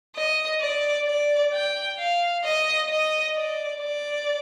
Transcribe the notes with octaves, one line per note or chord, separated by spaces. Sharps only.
D#5
D5
D5
G5
F5
D#5
D#5
D5
D5